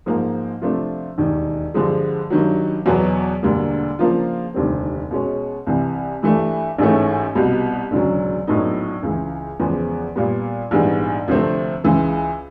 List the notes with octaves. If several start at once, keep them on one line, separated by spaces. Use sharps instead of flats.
G#2 F3 A#3
C3 F3 A3 D4 F4
E1 D#2 D#3
G2 D3 F3 G#3
G2 D#3 F#3
E2 B2 F#3 B3
E1 D2 D3 G3 A#3
C#3 F3 A#3 D4 F4
F1 D#2 D3 G3 C4
B2 G#3 C#4
C2 C3 E3
G2 E3 A3 D4
A1 G#2 E3 A3 C#4
C2 B2 G3 B3
E1 D2 C#3 F#3
A#1 A2 F#3 B3 D#4
C#2 C#3 E3
E2 C#3 F3 G#3 B3
A#2 G3 B3
A#1 G#2 E3 G3 B3
D2 C3 F3 A3 C4
C#2 C#3 E3 G#3